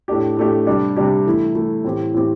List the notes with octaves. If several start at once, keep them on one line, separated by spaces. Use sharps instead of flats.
A2 A3 D4 G4
A2 A3 D4 G4
C3 G3 D4 G4
C3 G3 D4 G4
E3 A3 E4
E3 A3 E4
A2 E3 C4 G4
A2 E3 C4 G4